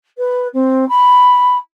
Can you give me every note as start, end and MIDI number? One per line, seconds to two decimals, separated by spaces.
0.18 0.48 71
0.54 0.87 60
0.88 1.57 83